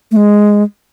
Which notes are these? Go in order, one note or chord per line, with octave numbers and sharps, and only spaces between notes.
A3
G#3